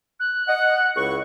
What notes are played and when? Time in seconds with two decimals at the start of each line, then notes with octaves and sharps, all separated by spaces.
0.20 F#6
0.48 D#5 F#5
0.96 C#2 E4 C#6